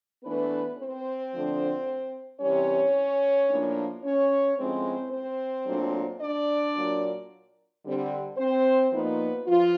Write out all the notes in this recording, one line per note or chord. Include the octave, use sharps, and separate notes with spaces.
E3 A3 B3 D4 B4
C4 C5
D3 F3 A3 D4
C3 E3 G3 C#4 C#5
A2 F3 A#3 D4
C#4 C#5
A2 F3 G#3 C4 C#4 C5
C4 C5
A#2 F#3 A3 D4
D4 D5
A#2 F#3 A#3
D3 G3 C4
C4 C5
A#2 F3 A#3 B3 D#4 B4
F3 F4